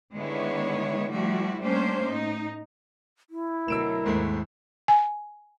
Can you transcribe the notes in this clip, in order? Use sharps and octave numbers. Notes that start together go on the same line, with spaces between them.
D3 D#3 G#3 B3 E4 C#5
F3 G3 A3 E4 F#4
G3 A3 A#3 C#4 D4 C5
A2 D#4
E4
D2 B2 F#3 A#4 E6 D7 E7
D#2 G#2 G#3 A3 C5
G#5